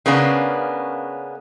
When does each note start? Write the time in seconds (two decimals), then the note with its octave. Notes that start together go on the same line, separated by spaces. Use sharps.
0.06 C#3 A#3 B3 C#4 D4